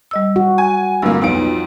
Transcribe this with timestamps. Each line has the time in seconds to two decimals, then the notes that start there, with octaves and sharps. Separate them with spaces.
0.11 G3 D#5 E6
0.36 F#4
0.58 G#5
1.02 D1 G2 A#2 A#3 E6
1.22 B1 F2 F4 D7